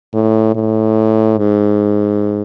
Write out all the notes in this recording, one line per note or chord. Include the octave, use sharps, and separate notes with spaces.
A2
A2
G#2